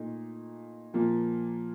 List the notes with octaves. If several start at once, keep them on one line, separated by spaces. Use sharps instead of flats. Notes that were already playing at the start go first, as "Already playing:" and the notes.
Already playing: A#2 A3 D#4
A#2 F3 A#3